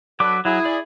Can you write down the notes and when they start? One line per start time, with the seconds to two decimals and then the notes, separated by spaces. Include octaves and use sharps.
0.20 F#3 D4 A4 B4 D6
0.45 F#3 E4 G#4
0.65 D5